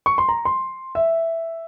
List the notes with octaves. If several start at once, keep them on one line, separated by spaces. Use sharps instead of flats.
C#6
C6
A#5
C6
E5